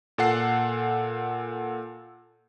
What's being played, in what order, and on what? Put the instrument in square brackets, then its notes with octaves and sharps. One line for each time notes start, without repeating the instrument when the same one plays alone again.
[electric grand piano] A#2 A4 F#5 C7